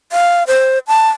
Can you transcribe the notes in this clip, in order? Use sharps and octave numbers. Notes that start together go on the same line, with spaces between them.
F5
C5
A5